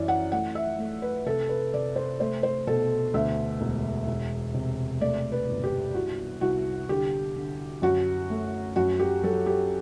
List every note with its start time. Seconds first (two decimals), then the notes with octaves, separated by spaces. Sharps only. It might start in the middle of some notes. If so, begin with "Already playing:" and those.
Already playing: F#2 E3 D5
0.08 F#5
0.32 A3 F#5
0.55 E5
0.79 A3
1.02 B4
1.26 C3 A4
1.49 B4
1.74 C3 D5
1.96 C5
2.20 A3 C5
2.43 C5
2.67 B2 A4
3.14 D2 E5
3.61 E1
4.07 E1
4.54 C3
5.01 A3 D5
5.32 B4
5.49 G1
5.64 G4
5.94 C2 F#4
6.41 C2 F#4
6.89 D3 G4
7.36 D3
7.82 F#2 F#4
8.30 A3
8.76 F#2 F#4
9.00 G4
9.23 F#3 A4
9.46 G4